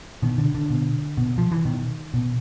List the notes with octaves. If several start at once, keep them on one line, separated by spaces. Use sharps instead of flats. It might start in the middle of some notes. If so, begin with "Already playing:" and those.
B2 D#3
D3
D3
B2
B2
F3
E3
B2 D#3
B2